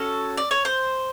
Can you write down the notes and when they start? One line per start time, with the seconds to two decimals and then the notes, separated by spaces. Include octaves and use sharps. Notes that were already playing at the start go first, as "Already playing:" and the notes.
Already playing: C#4 F#4 A4
0.37 D5
0.51 C#5
0.65 C5